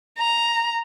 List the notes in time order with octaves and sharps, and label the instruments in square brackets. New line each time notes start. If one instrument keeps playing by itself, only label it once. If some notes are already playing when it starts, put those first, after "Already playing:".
[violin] A#5